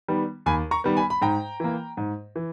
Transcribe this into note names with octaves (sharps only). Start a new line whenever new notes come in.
D#3 G3 B3
D#2 G#5 B5
A#5 C#6
D#3 G3 B3
G#5 B5
B5
G#2 G5 A#5
E3 A#3
G#2
E3